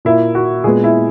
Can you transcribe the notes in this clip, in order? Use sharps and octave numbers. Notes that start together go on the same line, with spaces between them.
A#2 A#3 E4
F#4
A#2 G#3 B3 G#4
E4